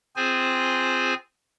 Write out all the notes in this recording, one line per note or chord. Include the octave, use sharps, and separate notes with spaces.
C4 F4 G#4 C5 G#5